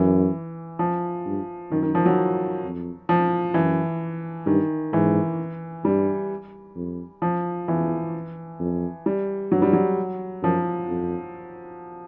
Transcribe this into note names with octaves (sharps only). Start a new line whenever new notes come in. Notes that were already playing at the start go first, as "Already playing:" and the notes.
Already playing: F#2 E3
F3
G2
F#2 D#3
D#3
F3
F#3
F2
F3
F#2 E3
G2 D#3
G#2 E3
G2 G3
F2
F3
E2 E3
F2
G3
G2 F#3
G3
F#3
F#2 F3
F2